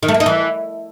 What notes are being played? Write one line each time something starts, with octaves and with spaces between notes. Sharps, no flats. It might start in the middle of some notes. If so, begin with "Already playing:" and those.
D#3
A3
A#3
D#4
E3